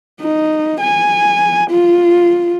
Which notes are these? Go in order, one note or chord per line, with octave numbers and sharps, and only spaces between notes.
D#4
G#5
F4